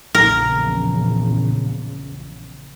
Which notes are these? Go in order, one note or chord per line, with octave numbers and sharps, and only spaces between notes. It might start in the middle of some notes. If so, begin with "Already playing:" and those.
A#1 E2 C#3 A#4